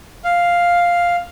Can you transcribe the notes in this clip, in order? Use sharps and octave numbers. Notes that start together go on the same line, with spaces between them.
F5